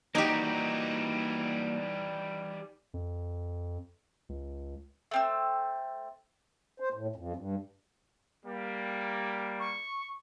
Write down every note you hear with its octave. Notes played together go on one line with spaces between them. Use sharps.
E3 G3 A#3 D#4 F#4 G4
F2
C#2
A3 C4 E6
C5
A2
F2
G2
G3 A#3
C#6